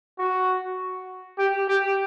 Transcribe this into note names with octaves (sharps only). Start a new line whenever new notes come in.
F#4
G4
G4